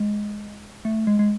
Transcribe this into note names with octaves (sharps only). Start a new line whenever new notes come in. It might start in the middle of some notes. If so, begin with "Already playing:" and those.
Already playing: G#3
A3
G#3
G#3